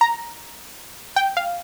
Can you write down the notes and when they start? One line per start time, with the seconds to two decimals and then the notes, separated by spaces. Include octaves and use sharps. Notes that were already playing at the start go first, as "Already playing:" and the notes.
0.01 A#5
1.16 G5
1.37 F5